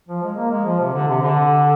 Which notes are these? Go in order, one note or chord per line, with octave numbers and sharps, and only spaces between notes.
F3
G#3
A#3
G#3
F3
C3
D3
C3
D3